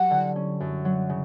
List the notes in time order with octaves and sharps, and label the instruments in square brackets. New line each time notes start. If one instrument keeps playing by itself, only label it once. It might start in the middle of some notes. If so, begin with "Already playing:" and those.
Already playing: [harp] F#3 G4 [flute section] F#5
[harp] D3
C#4
F#2
F#3
C#3